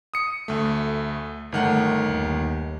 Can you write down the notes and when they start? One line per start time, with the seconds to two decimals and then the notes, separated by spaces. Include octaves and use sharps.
0.14 D#6 C#7
0.48 D2 A3
1.52 G1 D#3 A3 F#5
2.09 D#2